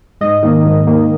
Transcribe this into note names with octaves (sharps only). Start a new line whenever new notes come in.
G#2 D#5
D#3 A#3
G#2
D#3 A#3